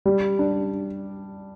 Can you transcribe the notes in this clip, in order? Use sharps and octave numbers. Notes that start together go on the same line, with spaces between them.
G3
D4